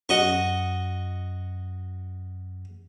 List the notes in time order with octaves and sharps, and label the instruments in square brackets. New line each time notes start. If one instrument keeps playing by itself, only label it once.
[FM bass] F#2 [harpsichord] F#4 D#5 C#6